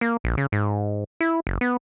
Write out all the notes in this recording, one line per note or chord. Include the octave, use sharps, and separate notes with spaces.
A#3
A#1
C#3
G#2
E4
F#1
B3